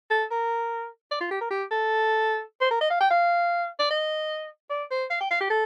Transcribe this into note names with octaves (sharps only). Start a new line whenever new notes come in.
A4
A#4
D5
F4
G4
A#4
G4
A4
C5
A#4
D#5
F5
G5
F5
D5
D#5
D5
C5
F5
G5
F5
G4
A4